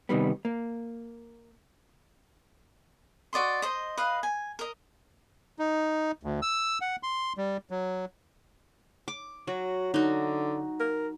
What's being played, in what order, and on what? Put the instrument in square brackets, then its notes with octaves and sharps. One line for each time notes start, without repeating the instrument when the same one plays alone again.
[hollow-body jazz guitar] C3 D#3 G3 B3
A#3
[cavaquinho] F#4 D5 D#5 C6
C5 D#5
B4 D#5 F5
G#5
A#4 D#5
[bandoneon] D#4
D2
E6
F#5
C6
G3
F#3
[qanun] D6
[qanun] F#3 [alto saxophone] F#4
[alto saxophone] D3 [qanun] D#4 F#4
[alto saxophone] A#4